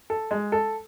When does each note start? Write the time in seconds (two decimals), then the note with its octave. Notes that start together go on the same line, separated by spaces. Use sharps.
0.10 A4
0.31 G#3
0.52 A4